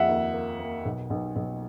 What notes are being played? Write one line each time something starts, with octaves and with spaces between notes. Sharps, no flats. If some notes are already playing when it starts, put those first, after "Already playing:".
Already playing: F2 E5 F#5
D#2
A#3
A#3
B1
B1
B1